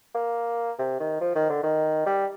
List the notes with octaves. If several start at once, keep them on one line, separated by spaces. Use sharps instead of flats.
A#3
C3
D#3
F3
D#3
D3
D#3
G3